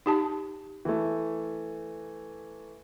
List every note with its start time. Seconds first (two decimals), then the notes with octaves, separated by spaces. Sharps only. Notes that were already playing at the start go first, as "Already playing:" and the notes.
0.06 D#4 G4 A5
0.85 E3 A3